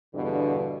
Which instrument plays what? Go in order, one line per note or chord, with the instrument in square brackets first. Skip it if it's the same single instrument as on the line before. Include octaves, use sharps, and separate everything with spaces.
[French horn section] E2 G2 B2 D3